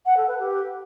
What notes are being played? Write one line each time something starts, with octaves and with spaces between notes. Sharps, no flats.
F#5
A4
B4
G4